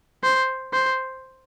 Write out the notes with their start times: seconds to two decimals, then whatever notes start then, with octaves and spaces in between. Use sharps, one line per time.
0.23 C5
0.73 C5